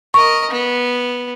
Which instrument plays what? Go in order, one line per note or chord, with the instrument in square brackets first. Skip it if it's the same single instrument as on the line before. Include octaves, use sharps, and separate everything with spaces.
[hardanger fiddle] A#4 D#5 [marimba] C#6
[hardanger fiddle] B3